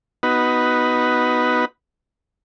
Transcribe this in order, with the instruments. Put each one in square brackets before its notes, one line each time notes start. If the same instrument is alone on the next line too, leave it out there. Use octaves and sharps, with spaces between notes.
[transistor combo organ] B3 D#4 F#4 B4